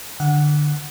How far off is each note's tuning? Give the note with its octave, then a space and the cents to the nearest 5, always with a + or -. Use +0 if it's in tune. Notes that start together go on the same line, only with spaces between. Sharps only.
D3 +15 F#5 +0